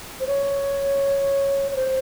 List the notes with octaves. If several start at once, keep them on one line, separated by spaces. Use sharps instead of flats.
C5
C#5
C#5
C5